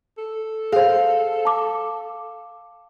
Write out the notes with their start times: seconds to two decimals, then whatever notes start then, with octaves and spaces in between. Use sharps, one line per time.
0.18 A4
0.72 G#4 C5 F5
1.45 A5 D6